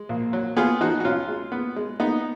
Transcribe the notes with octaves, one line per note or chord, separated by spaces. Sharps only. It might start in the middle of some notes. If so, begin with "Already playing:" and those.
Already playing: G#3
A#1
F#3
B3 F4 G#4
F3 D#4 F#4
F#4
B1 C#4 F4
G#3
B3
G#3
B3 D#4